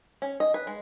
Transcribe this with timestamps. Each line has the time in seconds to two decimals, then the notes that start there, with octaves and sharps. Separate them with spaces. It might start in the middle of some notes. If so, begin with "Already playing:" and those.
0.22 C#4
0.40 D#5
0.54 B4
0.67 G#3